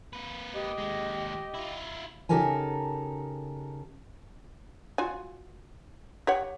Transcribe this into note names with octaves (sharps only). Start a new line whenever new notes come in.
A#3 B4
G4 D#5
D#2 G#3
E4 F4
C#3 D#4 G4 A4 A#4 G#5
F4 F#4 G#5
G4 C#5 F#5